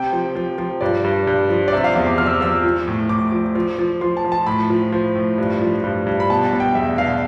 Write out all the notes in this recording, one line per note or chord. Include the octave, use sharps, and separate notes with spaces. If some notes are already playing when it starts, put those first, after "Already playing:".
Already playing: C3 G5
F3
F3
F3
G2 D5
G2
G2
F3
D5
C3 E5
F5
E2
D6
F3 F6
E6
D6
F3 E6
F3
A2
A2 D6
F3
F3
F3
F3 C6
A5
F3
A5
A2 B5
F3
F3
A2
G2
F3
G2
G2
B5
B2 A5
A5
B2
G5
E2 E5
B2 F5